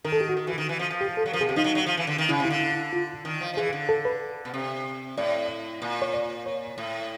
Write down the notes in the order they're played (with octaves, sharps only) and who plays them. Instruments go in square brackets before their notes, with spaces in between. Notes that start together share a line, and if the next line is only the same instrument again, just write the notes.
[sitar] D#3 [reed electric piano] A#4
[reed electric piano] A4
G4
F#4
[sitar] D#3
E3
D#3
E3
F3
F3
[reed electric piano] G4
A4
[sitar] F#3
[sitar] F3 [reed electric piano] A#4
[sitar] B2 [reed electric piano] G#4
[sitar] C3 [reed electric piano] G4
[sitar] F3 [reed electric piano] D#4
[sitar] F#3
F#3
F3
E3
D3
D#3
[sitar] C#3 [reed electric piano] E4
[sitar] C3
[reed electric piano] E4
[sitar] D3
[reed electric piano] E4
F4
[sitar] D#3
F3
F3
[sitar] E3 [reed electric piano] G#4
[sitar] D3
[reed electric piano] A4
B4
[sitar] B2
C3
[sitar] A2 [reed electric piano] D5
[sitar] A#2
[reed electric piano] C#5
D5
C#5
[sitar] A2